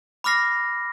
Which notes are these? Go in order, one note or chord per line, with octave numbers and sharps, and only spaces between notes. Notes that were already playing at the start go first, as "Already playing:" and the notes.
B5 D6 F6 A#6 C7